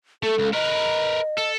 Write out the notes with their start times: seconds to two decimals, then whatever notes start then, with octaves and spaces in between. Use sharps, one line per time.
0.23 A3 A4
0.39 C#2
0.54 A#4 B4 D#5
1.38 A4